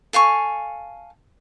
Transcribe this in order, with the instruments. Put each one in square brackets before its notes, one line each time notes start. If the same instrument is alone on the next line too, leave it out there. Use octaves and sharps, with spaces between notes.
[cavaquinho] A4 F5 G#5 C#6